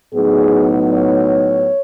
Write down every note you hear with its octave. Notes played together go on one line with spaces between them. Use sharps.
A2 F#3 B3 D#4 G#4
C#5